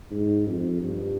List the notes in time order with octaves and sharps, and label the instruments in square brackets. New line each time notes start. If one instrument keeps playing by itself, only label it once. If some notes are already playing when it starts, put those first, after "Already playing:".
[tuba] G#2
F2
G2